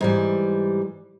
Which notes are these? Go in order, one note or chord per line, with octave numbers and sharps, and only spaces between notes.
G#2 E3 G3